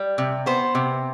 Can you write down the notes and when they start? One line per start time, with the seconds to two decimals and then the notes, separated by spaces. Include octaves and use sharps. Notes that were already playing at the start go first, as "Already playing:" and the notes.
Already playing: G3
0.18 C3
0.46 B3 C5
0.75 C3